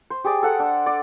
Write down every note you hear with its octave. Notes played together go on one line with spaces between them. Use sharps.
C5
G4 G#4 D5
A4 F#5
D4
D5